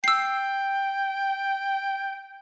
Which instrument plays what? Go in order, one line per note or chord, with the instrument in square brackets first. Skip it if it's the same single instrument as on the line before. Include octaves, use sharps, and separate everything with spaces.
[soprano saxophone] G5 [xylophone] E6 C7